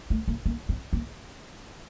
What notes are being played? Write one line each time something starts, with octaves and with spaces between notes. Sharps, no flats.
A3
A#3
A#3
C4
A#3